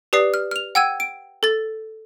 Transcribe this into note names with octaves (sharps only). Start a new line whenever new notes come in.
G4 B4 D5 D#6 C7
F6
F6 F7
F#5 G5 E6 G#6 D#7
D7
A4 A6